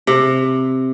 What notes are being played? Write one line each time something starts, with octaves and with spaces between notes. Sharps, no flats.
C3